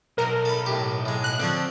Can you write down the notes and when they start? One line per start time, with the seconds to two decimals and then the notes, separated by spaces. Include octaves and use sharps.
0.18 B1 A#4
0.45 A4 B5
0.66 A2 G4
1.06 A2 G#3
1.24 F#6
1.40 D3 F3 C4 C#5